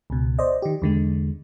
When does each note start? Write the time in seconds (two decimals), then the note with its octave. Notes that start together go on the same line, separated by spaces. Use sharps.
0.10 C#2 B2
0.39 C5 D5 D#5
0.62 D#3 G4
0.82 E2 D3 G#3